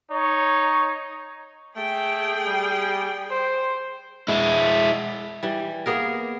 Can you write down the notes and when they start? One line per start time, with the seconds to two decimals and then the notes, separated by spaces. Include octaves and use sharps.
0.11 D#4 C#5
1.76 A3 G#4 G5
2.46 G3
3.31 C5
4.28 G#3 E4
5.43 E3 G3
5.86 A#3 B3 G#4 A#4